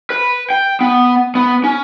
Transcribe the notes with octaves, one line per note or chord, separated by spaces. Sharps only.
B4
G5
B3
B3
C#4